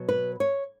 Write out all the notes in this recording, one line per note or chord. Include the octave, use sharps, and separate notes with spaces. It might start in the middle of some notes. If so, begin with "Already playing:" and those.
Already playing: B2 F#3 B3
B4
C#5